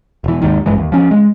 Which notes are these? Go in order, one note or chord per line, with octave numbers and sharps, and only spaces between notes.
E1 E3
D#2 G#2 D#3
G#1 G2 E3 G#3
D#2
F3 C#4
G#3